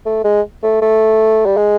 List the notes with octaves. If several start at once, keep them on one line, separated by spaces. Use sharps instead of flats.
A3
G#3
A3
A3
G3
G#3